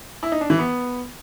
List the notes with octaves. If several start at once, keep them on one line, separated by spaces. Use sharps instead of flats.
E4
D#4
D4
E3
B3